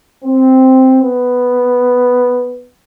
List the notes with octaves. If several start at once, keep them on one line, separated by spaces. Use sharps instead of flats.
C4
B3